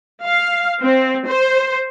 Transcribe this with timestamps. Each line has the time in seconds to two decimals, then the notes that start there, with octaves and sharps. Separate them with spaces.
0.24 F5
0.82 C4
1.26 C5